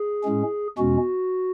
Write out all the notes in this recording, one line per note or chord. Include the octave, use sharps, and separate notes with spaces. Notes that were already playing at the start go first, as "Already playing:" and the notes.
Already playing: G#4
A2 G#3 C#4
E2 B2 G#3 C#4 F#4